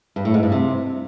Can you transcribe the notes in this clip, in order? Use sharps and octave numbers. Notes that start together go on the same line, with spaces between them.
G2
A2
G#2
G2
C3